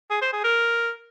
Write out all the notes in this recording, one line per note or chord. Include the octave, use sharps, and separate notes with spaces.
G#4
C5
G#4
A#4